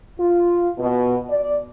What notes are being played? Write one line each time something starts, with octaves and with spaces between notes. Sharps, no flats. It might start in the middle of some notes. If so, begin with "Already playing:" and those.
F4
B2
D5